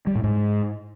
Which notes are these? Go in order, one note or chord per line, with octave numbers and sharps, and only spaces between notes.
G3
A2
G#2